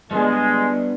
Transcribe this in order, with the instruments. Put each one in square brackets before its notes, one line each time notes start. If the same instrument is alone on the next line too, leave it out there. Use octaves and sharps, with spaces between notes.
[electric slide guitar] G3 B3 D4 [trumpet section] G#3